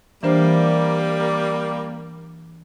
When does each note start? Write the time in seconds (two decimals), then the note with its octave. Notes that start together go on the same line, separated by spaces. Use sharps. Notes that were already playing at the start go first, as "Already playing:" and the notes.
0.23 E3 G3 A#3 D4 C5